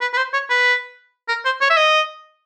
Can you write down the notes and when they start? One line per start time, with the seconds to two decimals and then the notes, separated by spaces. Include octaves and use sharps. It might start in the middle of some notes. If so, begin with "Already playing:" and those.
0.01 B4
0.13 B4
0.17 C5
0.34 C#5
0.50 B4
1.28 A#4
1.45 C5
1.61 C#5
1.70 E5
1.77 D#5